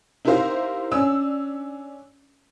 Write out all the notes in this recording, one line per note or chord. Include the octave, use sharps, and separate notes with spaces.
D#4 E4 G4 A#4 C5 F5
C#4 D4 E6